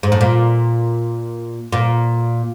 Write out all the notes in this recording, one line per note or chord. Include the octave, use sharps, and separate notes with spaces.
G#2
A2
A#2
A#2